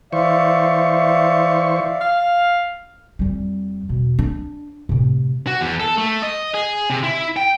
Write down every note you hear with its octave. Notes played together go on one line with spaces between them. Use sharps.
E3 C5 D5 E5 F5 C#6
F5
F2 G3
E2 B2
D4
A2 C3
F#4
E2
A4
A3
D#5
G#4
C3
E4
G5